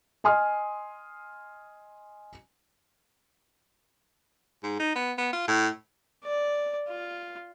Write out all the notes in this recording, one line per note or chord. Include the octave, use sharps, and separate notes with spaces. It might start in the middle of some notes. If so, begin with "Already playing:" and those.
D#5 G#5 C6 D#6 F6
G#2
D#4
B3
B3
F4
A2
D5
F4